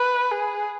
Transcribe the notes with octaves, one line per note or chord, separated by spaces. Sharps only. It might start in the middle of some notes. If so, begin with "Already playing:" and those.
Already playing: B4
G#4